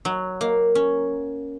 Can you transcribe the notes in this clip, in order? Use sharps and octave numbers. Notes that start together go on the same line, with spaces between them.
F#3
A#3
C#4